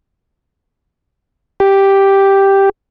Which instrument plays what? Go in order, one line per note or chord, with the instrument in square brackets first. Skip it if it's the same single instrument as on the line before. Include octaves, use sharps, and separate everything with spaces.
[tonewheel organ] G4